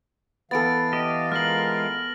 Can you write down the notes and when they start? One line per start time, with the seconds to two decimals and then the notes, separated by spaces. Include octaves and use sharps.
0.51 E3 B3 A4 F5 A6 D7
0.93 G4 D#5
1.32 G#3 F4 A#4 F6 A#6 F#7